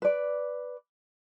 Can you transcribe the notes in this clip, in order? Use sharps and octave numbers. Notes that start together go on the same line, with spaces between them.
B4 D5